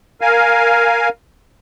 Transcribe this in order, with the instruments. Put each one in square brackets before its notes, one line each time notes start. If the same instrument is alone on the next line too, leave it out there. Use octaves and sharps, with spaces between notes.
[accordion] A#4 F5 G#5